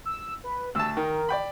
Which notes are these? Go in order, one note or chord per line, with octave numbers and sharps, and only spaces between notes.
E6
B4
D2 A5 E6
D#3 A#4
D5 G5 B5